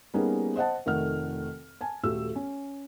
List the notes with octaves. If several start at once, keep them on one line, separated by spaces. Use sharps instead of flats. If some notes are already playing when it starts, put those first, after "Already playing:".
G3 A#3 B3 C#4 D#4 G#4
C5 D#5 F#5 A5
F1 D#3 A3 F#5 F6
G#5 A5
D#1 A3 F#4 G4 E6
C#4